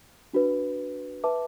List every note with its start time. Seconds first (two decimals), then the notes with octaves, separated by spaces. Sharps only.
0.33 D4 F#4 B4
1.24 B4 E5 A5 D6